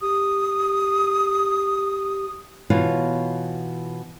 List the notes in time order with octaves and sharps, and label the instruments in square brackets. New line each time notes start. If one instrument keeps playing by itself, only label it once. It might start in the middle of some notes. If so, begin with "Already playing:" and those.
[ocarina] G4 [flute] D#6
[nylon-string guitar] B2 E3 F4 C#5 F5